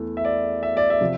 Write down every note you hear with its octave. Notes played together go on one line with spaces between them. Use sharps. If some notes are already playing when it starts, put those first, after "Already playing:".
Already playing: E2 E3 A3
E5
D5
E5
D5
E5
C3 F3